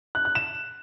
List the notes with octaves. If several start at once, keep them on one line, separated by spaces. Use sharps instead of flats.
F#6
F#6
E7